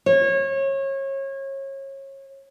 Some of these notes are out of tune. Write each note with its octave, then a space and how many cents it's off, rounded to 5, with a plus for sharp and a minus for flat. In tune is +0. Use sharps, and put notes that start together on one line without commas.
C#5 -30